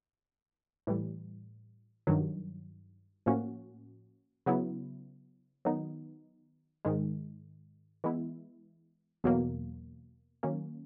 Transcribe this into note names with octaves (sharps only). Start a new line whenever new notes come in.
A2 E3 G3
G2 D#3 F#3
A2 F3 A#3 C#4 F#4
C#3 F#3 B3 E4
D#3 F#3 B3 D#4
G#2 D#3 G#3
E3 G#3 B3 E4
E2 B2 F#3 A#3
D#3 F#3 A#3 C#4